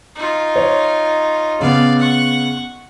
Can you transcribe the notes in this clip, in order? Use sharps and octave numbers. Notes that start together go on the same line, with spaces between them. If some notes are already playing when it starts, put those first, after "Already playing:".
D#4 F4
C#5
C#3 B3 D5 F5
F#5 C#6